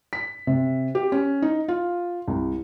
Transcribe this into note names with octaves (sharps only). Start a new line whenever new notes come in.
B6
C3
G4
C#4
D#4
F4
C2